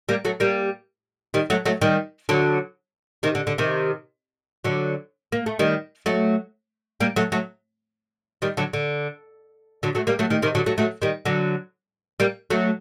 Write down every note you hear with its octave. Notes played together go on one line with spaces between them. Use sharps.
G3 A#3
F#3 A3
G3 A#3
D#3 G3
F#3 A3
F#3 A3
D#3 G3
D3 F#3
C3 D#3
D3
D3
C3 D#3
D3 F#3
A#3
A3
D#3 G3
F#3 A3
G3 A#3
F#3 A3
F#3 A3
D#3 G3
D3 F#3
D3
D3 F#3
F#3 A3
G3 A#3
F#3 A3
D#3 G3
C3 D#3
D3 F#3
F#3 A3
F#3 A3
D#3 G3
D3 F#3
G3 A#3
F#3 A3